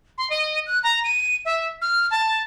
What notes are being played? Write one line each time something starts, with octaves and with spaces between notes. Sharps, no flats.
C6
D#5
F#6
A#5
D#7
E5
F6
A5